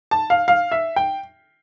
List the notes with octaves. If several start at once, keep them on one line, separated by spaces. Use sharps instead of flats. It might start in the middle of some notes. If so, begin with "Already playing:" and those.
A5
F5
F5
E5
G5